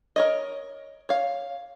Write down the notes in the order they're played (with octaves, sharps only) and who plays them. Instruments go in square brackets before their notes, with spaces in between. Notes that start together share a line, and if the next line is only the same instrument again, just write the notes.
[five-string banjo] A#4 C#5 D#5
C#5 F5